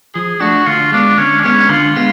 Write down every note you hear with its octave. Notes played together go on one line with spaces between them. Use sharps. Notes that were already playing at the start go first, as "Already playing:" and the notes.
F3 G#4
A3 D4 F#4
D3 F4
G#3 B3 D4
D3 C#4
D4
G#3 B3 C#4
D3 F4
G#3 B3